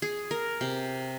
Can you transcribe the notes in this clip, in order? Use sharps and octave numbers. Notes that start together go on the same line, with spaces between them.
G#4
A#4
C3